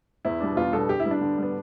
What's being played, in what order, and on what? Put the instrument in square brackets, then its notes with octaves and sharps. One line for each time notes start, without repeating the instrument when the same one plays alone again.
[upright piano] E2 [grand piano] E4
[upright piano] B2 G3 D4
[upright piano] E2 [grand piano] F4
[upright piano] B2 G3 D4 [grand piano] A4
[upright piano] D3 [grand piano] G4
[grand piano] E4
[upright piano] G3 B3
[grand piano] D4
[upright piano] D3
G3 B3